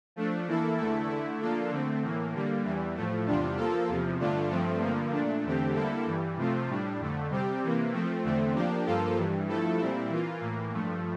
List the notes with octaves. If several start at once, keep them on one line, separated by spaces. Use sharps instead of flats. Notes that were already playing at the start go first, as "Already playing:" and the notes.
F3 A3 D4
E3 A#3 E4 A4
E2 D3 A3 E4 A4
D3 A3 E4
F3 A#3 D4 F4 A4
D3 A3 C4
A2 E3 A#3
D3 G3 A#3
E2 E3 G3
A2 F3 A3
E2 C3 G3 D4 F4
F3 A#3 F4 A4
E2 C3 F3
G2 D3 A3 D4 F4
G2 F3 A3 C4
G2 D3 F3 A#3
A#2 A3 D4
E2 D3 A3 C4 G4
D3 G3 A#3 E4 A4
G2 E3 G3
C3 F3 A3 C4 F4
A2 G3 D4
F2 D3 A3
C3 G3 C4 G4
C3 E3 A#3
F3 A3 C4
E2 D3 A3 C4
F3 A#3 D4 G4
G2 F3 A#3 F4 A4
G2 E3 G3
G2 F3 A3 E4 A4
A#2 G3 C4 E4
E3 A#3 F4
A2 E3 A#3
G2 F3 A3